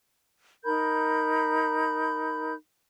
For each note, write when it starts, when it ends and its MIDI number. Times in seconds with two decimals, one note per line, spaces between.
0.63 2.53 63
0.63 2.53 70
0.63 2.53 83
0.63 2.53 91